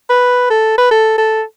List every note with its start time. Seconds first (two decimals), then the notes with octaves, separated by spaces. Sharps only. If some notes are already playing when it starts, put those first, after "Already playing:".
0.10 B4
0.50 A4
0.78 B4
0.91 A4
1.18 A4